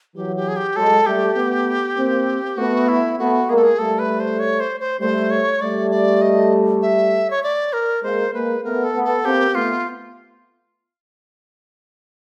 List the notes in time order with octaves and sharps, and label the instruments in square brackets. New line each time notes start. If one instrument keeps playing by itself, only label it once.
[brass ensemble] E3 F#3 [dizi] G4
[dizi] G4
G#4
G4
[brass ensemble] F#3 G#3 [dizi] A4
[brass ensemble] G3 A3 [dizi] G4
[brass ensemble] A3 B3
A#3 C4
[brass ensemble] A3 B3 [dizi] F#4
[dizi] E4
[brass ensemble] A3 B3 [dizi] F#4
[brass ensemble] G#3 A#3 [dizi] G#4
[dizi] A4
G#4
[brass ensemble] G3 A3 [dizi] A4
[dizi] B4
C5
C#5
C5
C5
[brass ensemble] G3 A3 [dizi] C5
[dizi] C#5
[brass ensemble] G3 A3 [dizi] D5
[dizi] D5
D#5
E5
C#5
D5
A#4
[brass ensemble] G#3 A#3 [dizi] C5
[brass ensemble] G#3 A#3 [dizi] B4
[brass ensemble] A3 B3 [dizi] A#4
[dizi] A4
[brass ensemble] A3 B3
[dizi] A4
[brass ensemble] A#3 C4 [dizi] G4
[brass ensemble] A3 B3 [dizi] F4